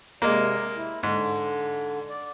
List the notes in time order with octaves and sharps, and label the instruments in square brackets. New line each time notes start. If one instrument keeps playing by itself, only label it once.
[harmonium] C3 D5 [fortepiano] G#3 A#3
[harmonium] E4
[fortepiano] G#2 [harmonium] D3
[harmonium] D5